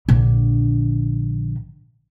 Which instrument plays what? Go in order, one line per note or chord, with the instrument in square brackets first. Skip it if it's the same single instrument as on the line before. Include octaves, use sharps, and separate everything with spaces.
[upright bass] A#1 D3